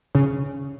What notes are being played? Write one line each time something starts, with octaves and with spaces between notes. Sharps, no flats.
C#3